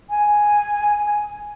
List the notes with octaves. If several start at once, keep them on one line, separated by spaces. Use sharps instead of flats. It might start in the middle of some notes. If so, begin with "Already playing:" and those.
G#5